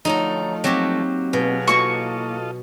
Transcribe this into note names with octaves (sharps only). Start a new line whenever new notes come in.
D3 F3 F#3 A3 D#4 A#5
F#3 A#3 C4 F#4 G4
B2 F#3 G#4 F5
E3 A#3 F4 F#4 A4 D#5 C#6